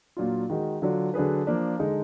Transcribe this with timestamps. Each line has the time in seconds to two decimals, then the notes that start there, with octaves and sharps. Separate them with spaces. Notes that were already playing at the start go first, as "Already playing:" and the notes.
0.17 A#2 F#3 D4 F4
0.50 D#3 G#3 D#4 F#4
0.82 D3 F#3 D4 F4
1.14 D3 F#3 D4 G#4 B4
1.47 F3 A#3 D4
1.79 D3 G#3 D#4